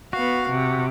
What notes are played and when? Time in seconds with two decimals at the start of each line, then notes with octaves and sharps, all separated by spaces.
0.13 B3 F#4 F5
0.49 C3